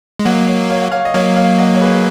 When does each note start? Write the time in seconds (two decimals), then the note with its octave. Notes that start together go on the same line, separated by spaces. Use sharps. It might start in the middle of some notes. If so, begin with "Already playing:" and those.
0.19 G#3
0.25 F#3 A#3 D#5 F#5
0.47 C#5 F5
0.70 C#5 F5
0.81 F#5
0.92 C#5 F5
1.05 D#5
1.14 F#3 A#3 C#5 F5
1.36 C#5 F5
1.58 D#5 F#5
1.75 C#5
1.81 G#4 B4